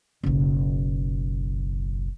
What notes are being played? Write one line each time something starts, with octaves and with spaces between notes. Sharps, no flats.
F#1 B1